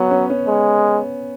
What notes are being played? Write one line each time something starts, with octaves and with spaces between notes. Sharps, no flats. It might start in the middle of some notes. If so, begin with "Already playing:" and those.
Already playing: F#3 B3
C#4
C#4
G#3